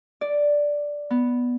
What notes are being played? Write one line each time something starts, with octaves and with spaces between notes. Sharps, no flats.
D5
B3